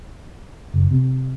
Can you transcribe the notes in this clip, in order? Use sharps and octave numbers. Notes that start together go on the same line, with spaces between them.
F#1
C3